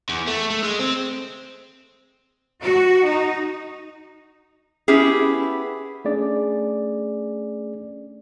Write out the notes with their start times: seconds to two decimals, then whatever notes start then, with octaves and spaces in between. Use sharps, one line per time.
0.09 E2
0.27 A3
0.50 A3
0.63 G#3
0.79 C4
2.64 F#4
3.08 D#4
4.88 B3 C#4 E4 G4 G#4
6.05 A3 C#4 D4 G#4 D5